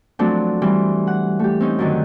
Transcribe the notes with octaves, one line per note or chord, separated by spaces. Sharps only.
F3 F#3 A3 C4 D4
E3 G3 C4
F#5
A3 G4
C4 C#4 D#4
F#2 D3 D#3